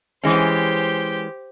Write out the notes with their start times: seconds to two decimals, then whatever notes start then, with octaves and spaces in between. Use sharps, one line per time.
0.23 E3 G#3 C#4 G4 C5